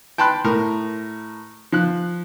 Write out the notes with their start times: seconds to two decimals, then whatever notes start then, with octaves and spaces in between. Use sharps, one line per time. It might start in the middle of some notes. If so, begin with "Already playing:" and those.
0.18 G5 A5 B5 C6 F#6
0.44 A2 A#4
1.72 F3 F#6